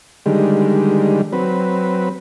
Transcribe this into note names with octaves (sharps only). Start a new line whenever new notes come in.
D3 D#3 G3 G#3
F#3 C4 B4